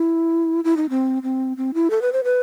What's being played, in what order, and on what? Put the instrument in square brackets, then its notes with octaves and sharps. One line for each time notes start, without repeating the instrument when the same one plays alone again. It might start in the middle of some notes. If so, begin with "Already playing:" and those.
Already playing: [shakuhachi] E4
E4
D#4
C4
C4
C4
E4
A4
B4
C5
B4